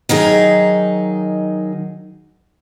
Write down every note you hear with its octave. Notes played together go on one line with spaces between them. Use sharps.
D#3 F#3 D#4 G#4